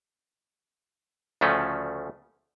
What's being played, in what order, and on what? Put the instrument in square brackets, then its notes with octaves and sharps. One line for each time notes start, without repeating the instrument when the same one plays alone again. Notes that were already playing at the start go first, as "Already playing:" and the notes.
[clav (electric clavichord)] D2 C#3 F3 A3 C#4